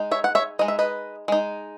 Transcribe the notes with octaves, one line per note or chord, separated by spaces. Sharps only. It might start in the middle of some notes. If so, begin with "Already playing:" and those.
Already playing: G#3 D#4
C#5 E5
F#5
C#5 E5
G#3 D#4 D#5
E5
B4 D#5
G#3 D#4